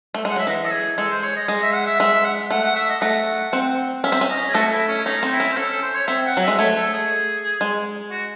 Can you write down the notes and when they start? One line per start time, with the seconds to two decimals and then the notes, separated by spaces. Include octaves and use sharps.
0.14 A3
0.25 G#3 F#5
0.36 F#3 E5
0.47 E3 D#5
0.65 A4
0.72 G#4
0.98 G#3 A4
1.11 C5
1.23 C#5
1.36 D#5
1.48 G#3 D#5
1.62 E5
1.74 F#5
1.86 E5
2.00 G#3 E5
2.13 E5
2.25 F#5
2.51 A3 F#5
2.64 F#5
2.76 E5
2.89 D#5
3.01 A3 F#5
3.53 C4
4.04 C#4 E5
4.12 C4
4.21 C#4
4.29 D#5
4.49 G#4
4.54 A3 F#4 A4
4.72 E4
4.88 C#4
5.05 C#4 D#4
5.23 C4
5.31 E4
5.40 C#4
5.52 C5
5.56 C#4 A4
5.70 A4
5.82 C5
5.95 C#5
6.07 C4 E5
6.25 F#5
6.37 F#3 E5
6.48 G#3
6.58 A3 C#5
6.76 A4
6.93 G#4
7.61 G#3
8.11 F#4